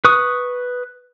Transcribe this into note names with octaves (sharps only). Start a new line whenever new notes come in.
B4 C#6 D#6